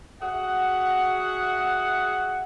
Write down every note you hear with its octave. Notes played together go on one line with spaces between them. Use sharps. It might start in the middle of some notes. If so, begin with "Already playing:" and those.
F#4 G#4 E5 F#5